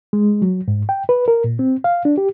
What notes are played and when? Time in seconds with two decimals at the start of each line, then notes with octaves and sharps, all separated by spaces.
0.13 G#3
0.42 F#3
0.68 G#2
0.89 G5
1.09 B4
1.28 A#4
1.44 A#2
1.59 C4
1.84 F5
2.05 D4
2.18 G4